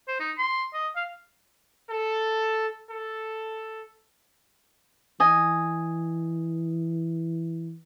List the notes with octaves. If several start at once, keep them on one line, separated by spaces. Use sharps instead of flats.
C5
D#4
C6
D#5
F5
A4
A4
E3 D#5 G#5